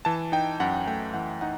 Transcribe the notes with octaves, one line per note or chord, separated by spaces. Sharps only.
E3 A5
D#4 G5
F#2 F#5
A3 G5
E3 F#5
D#4 F#5